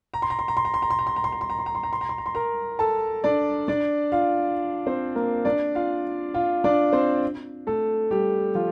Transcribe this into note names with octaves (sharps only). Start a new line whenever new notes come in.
A#5
C6
A#5
C6
A#5
C6
A#5
C6
A#5
C6
A#5
C6
A#5
C6
A#5
C6
A#5
C6
A#5
C6
A#5
C6
A#5
C6
A#5
C6
A#4 A#5
A4 A5
D4 D5
D4 D5
F4 F5
C4 C5
A#3 A#4
D4 D5
F4 F5
F4 F5
D4 D5
C4 C5
A3 A4
G3 G4
F3 F4